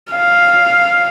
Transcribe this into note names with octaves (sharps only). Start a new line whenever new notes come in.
F5